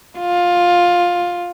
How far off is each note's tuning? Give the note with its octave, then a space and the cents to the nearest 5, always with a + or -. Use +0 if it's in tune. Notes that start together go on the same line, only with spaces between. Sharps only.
F4 +10